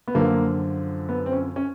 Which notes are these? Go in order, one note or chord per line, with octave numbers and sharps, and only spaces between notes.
B3
F#2 D3 F3 A#3
B3
C4
C#4
C#4